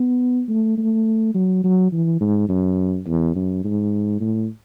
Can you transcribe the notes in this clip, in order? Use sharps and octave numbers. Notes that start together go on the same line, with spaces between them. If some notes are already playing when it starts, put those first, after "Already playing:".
Already playing: B3
A3
A3
F#3
F#3
E3
G#2
F#2
E2
F#2
G#2
A2